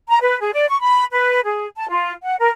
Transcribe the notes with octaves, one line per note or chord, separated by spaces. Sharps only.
A#5
B4
G#4
D5
C#6
B5
B4
G#4
A5
F4
F#5
A#4